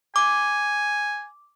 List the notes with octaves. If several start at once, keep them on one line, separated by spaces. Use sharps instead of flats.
G#5 D6